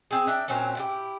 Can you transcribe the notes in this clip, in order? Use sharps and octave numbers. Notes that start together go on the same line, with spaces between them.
C4 G#4
D4 E5 G5
A#2 F#3 C4 C#4
E4 F#4 G4